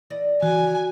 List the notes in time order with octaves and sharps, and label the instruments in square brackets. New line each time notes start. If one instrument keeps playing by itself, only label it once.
[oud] E3 D5 D#5
[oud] C#3 [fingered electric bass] E3 [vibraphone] F#4 [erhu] G#5